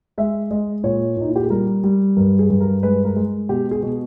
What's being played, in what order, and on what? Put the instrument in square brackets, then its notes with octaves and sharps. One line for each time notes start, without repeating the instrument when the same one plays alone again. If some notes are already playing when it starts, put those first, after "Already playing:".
[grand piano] G#3 E5
G#3 D#5
A#2 C#5
A#2 D#4
E4
G4
G#4
G3 A#4
G3
G2 A#4
G#4
G2
A#4
G#3 B4
A#4
G#3
B2 G4
G#4
B2